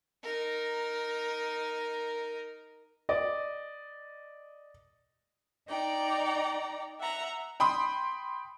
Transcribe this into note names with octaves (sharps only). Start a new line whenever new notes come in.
D#4 A#4
D5 D#5
D#4 D5 G5 A#5
E5 F#5 A#5
G5 B5 C6 D#6